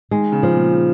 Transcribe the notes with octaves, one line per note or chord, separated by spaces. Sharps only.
D#3 G#3
C#3
F3
A#2